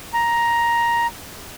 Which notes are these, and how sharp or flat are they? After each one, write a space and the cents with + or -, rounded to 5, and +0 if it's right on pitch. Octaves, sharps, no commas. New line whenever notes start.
A#5 +10